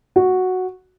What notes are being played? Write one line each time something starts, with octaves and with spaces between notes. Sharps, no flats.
F#4